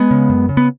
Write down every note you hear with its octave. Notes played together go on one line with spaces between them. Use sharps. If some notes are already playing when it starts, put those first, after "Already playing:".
Already playing: G#3 B3
C#3
F#2
C#3
B3